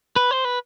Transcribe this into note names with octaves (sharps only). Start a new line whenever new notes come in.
B4
C5
B4